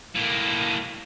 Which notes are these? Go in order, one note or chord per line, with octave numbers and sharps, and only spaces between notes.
A2 A#3